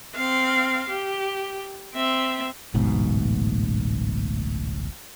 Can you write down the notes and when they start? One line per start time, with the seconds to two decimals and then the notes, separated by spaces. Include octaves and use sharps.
0.15 C4 F5
0.89 G4
1.94 C4 E5
2.74 D1 A1 G#2 B2